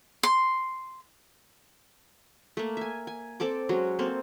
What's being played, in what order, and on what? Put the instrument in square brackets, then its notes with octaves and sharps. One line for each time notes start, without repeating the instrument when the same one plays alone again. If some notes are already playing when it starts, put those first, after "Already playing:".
[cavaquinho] C6
[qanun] A3 A#3
E5 G#5
G#5
C4 A4 D5 D6
F#3 G#3 C#4 F#4
A#3 C4 A4 C5